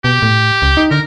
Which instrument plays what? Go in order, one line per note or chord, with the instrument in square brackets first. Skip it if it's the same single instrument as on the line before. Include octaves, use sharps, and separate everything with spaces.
[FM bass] B2 [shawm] G4
[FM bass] A2
C#2
D#4
[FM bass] D3 [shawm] A#4